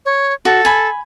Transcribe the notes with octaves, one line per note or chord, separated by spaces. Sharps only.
C#5
F#4 A4
G#5 B5